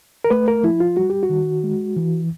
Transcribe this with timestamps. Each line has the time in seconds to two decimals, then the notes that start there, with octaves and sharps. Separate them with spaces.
0.24 A#4
0.30 A3 B4
0.48 A#4
0.63 F3 E4
0.80 F4
0.97 G3 F#4
1.10 G4
1.23 F#4
1.30 D#3
1.64 G#3
1.96 E3